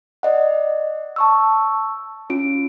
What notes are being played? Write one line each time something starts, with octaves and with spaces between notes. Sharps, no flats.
D5 D#5 F#5
A5 C#6 E6
C#4 F4 D7